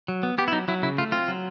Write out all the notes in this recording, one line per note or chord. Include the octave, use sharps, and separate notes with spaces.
F#3
B3
B3 G4
E4
F#3 D#4
F#3 E4
C#3 E4
A3 F4
C4 F4
F#3